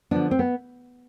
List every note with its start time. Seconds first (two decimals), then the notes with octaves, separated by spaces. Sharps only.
0.11 D3 F3 B3 D4
0.31 C4
0.39 B3